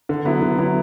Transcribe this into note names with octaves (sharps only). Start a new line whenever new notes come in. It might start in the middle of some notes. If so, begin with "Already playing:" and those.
D3
F#3 B3 E4
D3
F#3 B3 E4